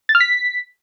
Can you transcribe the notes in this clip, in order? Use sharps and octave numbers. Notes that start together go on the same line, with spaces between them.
A6
F6
B6